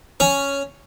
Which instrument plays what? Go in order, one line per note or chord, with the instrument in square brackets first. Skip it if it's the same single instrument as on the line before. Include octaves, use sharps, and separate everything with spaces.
[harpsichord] C#4